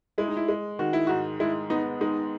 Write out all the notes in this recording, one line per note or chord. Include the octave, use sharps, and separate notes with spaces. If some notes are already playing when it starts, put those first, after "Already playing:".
G#3 E4
D#4
E4
G#3
D#3 F#4
E4
G#2 F#4
G#3 E4
B3 D#4
G#3 D#4